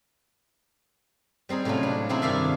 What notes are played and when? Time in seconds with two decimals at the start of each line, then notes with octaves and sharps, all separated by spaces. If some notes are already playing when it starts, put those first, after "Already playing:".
1.49 G3 C4 D#4 G#4
1.65 A2 C3 F#3 C#4 F4
1.83 D4
2.09 C3 C4 D#4 E4 G#4
2.22 G2 D#3 E4 D5 E5 F5